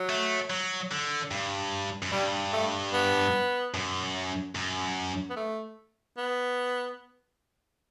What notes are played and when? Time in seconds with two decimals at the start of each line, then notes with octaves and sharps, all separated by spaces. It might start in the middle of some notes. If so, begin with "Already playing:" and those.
Already playing: F#3
0.09 A3
0.50 F#3
0.91 D3
1.31 G2
2.02 F#2
2.12 G2 G3
2.53 A3
2.93 B3
3.74 F#2
4.55 F#2
5.30 B3
5.37 A3
6.17 B3